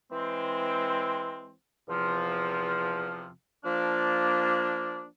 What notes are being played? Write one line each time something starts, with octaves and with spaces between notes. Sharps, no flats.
E3 G#3 C4
E2 C3 F3
F3 A#3 D4